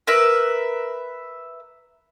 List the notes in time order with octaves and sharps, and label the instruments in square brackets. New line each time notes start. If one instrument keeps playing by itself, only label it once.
[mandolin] A#4 B4 E5 F#6